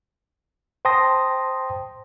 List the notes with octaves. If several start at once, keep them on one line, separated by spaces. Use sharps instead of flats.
C5 G5 A5 C6 D#6 A#6